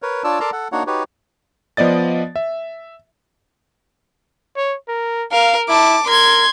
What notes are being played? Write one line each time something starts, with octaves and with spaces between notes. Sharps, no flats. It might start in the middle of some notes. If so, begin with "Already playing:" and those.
A#4 B4 C#5
D4 F4 C#5 D5 A5 E6
A4 A#4 D5 A5 A#5 C6
A4 F#5
A#3 D4 D#4 F#4 C#5 F#5
D#4 F#4 G4 B4 C#5
F3 B3 D5 D#5 A6
E5
C#5
A#4
A#4 F5
E4 A5 D6
A#4 C6 G#6